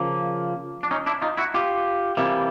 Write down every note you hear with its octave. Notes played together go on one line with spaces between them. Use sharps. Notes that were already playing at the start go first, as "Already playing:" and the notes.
Already playing: C#3 F3 A#3
D4
C#4 D#4
D4 E4
D#4 F4
E4 F#4
F4 G4
C3 E3 G3 A#3